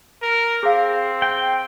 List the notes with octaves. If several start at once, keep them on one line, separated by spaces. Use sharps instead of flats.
A#4
C4 G#4 F5
G5